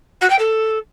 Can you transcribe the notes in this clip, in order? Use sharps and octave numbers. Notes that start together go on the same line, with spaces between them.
F#4
G5
A4